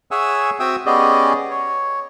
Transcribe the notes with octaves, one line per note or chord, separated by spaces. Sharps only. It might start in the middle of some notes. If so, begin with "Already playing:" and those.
G#4 C#5 E5 F#5 G#5 E6
C4 F#4 E5 G5 D#6 E6
B3 C#4 G4 G#4 D5 D#5
C#5